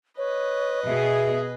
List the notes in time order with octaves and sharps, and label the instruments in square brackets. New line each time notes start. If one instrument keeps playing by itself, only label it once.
[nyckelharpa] B4 D#5 [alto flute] C#5
[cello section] B2 G#4 [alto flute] E5